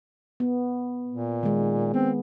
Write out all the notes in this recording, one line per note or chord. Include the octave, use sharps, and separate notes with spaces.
B3
A#2
D#3 G#3
B3 C4